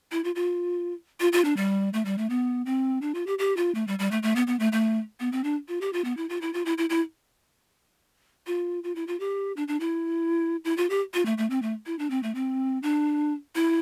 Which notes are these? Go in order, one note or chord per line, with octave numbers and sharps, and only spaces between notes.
E4
F4
F4
F4
F4
D4
G3
A3
G3
A3
B3
C4
D4
F4
G4
G4
F4
A3
G3
G3
A3
A3
B3
B3
A3
A3
B3
C4
D4
F4
G4
F4
B3
E4
F4
E4
F4
E4
E4
E4
F4
F4
E4
F4
G4
D4
D4
E4
E4
F4
G4
F4
A3
A3
C4
A3
E4
D4
C4
A3
C4
D4
E4